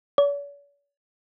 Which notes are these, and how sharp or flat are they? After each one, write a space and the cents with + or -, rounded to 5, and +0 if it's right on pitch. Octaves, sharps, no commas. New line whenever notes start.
C#5 +45